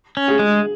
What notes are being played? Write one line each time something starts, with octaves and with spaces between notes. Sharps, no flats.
C#4
G#4
G#3